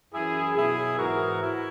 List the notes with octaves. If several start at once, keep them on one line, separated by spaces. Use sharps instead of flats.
F#2 E3 E4 G#4
B2 F#3 E4 G#4
G#2 E3 F#4 A#4
E4